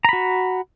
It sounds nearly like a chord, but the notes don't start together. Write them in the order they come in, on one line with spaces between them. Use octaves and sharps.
A#5 B5 F#4